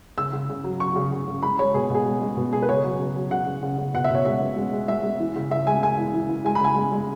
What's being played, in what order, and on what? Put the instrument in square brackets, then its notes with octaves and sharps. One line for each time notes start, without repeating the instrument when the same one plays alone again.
[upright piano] C#3 E6
C#3
C#3
F#3
F#3 C#6
C#3
C#3
C#3
G#3 B5
G#3 C#5
B2 G#4
B2 G#4
G#3
G#3
B2
B2 G#4
B4
C#3 C#5
F#3
C#3
F#3
C#3 F#5
C#3
C#3
C#3
B2 F#5
E5
B2 C#5
G#3 E5
B2
G#3
G#3
G#3 E5
G#3
E3
C#3
C#3 E5
G#3 G#5
C#3 G#5
E3
E3
E3
G#3 G#5
B5
C#3 G#5
G#3
G#3